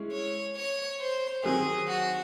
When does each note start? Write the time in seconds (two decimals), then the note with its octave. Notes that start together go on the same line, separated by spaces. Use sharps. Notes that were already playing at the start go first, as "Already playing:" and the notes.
Already playing: G#3 C#4 E4 G#4
0.12 C#5
0.56 C#5
1.01 C5
1.44 D#3 F#3 C4 G#4
1.88 F#4